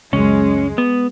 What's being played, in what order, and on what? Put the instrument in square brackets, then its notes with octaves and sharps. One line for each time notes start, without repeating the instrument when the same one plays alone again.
[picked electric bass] C#2 F#2 [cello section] G#3 [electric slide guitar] C#4
[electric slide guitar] B3